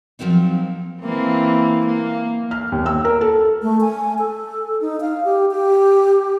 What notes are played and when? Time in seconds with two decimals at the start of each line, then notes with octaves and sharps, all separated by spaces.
0.19 F3 F#3 A#3 C4 D#4
1.02 E3 A#3 C4
1.86 A#3
2.51 F6
2.72 D#2
2.86 E6
3.05 A#4
3.21 A4
3.63 A3
3.81 G#5
4.19 A4
4.81 D#4
5.01 F5
5.25 G4
5.51 G4